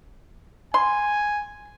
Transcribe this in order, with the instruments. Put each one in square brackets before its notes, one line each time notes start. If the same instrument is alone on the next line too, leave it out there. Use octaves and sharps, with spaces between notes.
[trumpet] G#5 [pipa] C6